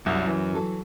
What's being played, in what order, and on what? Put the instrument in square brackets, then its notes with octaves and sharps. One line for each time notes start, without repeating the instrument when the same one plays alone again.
[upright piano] C2 [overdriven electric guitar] F#2
[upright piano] E3
[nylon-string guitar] F#3 A4